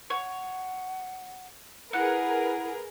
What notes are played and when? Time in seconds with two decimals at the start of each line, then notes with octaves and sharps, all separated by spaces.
0.10 C#5 F#5
1.93 E4 G#4 A#4 B4 F#5